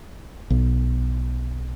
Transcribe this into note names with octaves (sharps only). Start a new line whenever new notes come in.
B1